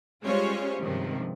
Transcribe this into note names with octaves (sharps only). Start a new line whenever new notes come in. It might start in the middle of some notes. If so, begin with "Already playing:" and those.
G3 G#3 C#4 F4 C5 C#5
C#2 G2 C3 D#3 F3